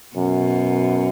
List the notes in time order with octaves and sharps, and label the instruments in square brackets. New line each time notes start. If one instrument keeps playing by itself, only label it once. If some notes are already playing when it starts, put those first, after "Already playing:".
[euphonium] F#2 [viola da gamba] B2